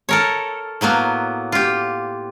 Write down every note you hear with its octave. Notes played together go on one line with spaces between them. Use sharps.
A4 A#4 C#5
A2 F#3 A#3 B3
F4 G4